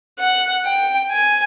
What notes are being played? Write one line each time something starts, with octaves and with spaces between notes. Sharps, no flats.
F#5
G5
G#5